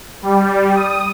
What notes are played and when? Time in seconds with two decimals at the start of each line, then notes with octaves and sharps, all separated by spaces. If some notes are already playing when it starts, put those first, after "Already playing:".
0.22 G3
0.75 D#6